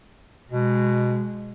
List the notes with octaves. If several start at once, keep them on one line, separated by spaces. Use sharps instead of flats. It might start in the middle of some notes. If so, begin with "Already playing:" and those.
B2 G#3